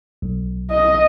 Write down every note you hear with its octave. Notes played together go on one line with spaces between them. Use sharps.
B1
D#5